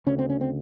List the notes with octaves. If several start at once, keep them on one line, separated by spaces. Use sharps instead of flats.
D2 C#3 C#4
C4
C#4
C4